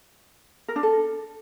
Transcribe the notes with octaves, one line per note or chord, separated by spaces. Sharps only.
A#4
D4
A4